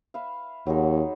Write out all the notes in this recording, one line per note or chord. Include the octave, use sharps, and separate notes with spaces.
B4 E5 F5
D#2 F#3 G#3 D#4